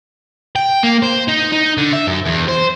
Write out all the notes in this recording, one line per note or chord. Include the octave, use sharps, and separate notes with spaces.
G5
A#3
C5
D#4
D#4
D3
E5
F#2
E2
C5